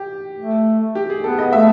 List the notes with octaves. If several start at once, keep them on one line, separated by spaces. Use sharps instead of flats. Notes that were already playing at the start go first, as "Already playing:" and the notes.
Already playing: G4
A3
G4
G#4
B3 A4
D#5
A3 E5